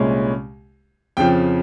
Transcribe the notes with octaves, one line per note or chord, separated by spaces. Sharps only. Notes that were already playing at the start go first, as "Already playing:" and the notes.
Already playing: C2 A#2 G#3 C#4
F2 C#3 F3 G5